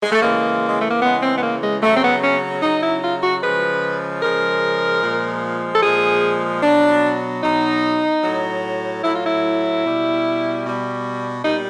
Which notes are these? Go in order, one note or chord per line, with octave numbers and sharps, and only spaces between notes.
G#3
A3
C#3 E3 G#3 A#3
G#3
A3
A#3
C#3 E3 G#3 B3
C4
B3
A#3
G#3
C#3 F#3 A3
C4
B3
C#4
C#3 F#3 D#4
E4
F4
F#4
C#3 F3 G#3 B4
C#3 F3 G#3 A#4
A#2 F3 G#3
A4
A#2 F3 G#3 G#4
B2 F#3 D4
B2 F#3 D#4
A2 F#3
A2 F#3 E4
F4
E4
B2 G3
B2 G3
A#2 G3 D#4